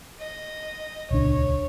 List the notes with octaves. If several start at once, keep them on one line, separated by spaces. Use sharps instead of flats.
D#5
D#1 C#2 D4 C#5